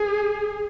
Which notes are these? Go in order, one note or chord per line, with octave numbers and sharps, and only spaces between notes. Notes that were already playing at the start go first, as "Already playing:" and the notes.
Already playing: G#4